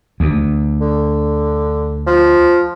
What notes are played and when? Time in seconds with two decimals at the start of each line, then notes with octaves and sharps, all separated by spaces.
0.20 D2
0.81 D3
2.07 F3